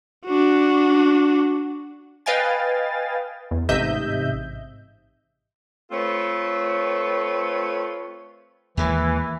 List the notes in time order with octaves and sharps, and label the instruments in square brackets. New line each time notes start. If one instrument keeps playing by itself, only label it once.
[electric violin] D4 F#4
[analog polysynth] B4 D#5 F5 G5 G#5 A6
E2
A1 G#2 C3 D#5 E5 G6
[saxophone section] A3 C4 F4 A4 B4 C#5
[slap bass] D#2 G#3 A#3 [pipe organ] E3